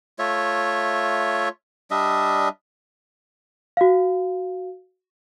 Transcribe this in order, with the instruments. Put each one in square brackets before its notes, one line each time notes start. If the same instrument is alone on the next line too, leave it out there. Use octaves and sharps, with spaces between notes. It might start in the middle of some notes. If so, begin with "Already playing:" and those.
[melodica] A3 F4 C#5 E5
G3 D4 D#5 E5
[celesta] F#4 F5